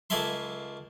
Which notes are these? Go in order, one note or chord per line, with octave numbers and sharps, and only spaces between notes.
C#2 A#3 G#4 A4 E5 C6